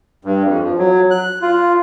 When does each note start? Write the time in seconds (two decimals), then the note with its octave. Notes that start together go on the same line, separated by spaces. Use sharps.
0.25 G2
0.45 F2
0.64 F3
0.78 F#3
1.11 F#6
1.42 F4